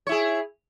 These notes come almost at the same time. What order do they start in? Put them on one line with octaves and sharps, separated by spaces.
C#5 E4 G#4